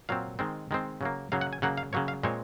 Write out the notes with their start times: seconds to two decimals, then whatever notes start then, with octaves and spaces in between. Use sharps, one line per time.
0.09 A#2 F#3 C4 F5
0.39 D#3 G#3 C4
0.71 D#3 G#3 C4
1.01 C#3 F#3 A#3
1.32 C#3 F#3 A#3 F5
1.41 F#5
1.53 G#5
1.62 C#3 F#3 A#3 F#5
1.77 F5
1.93 C#3 F#3 A#3 C#5
2.08 F5
2.23 A#2 G#3 C4 C#5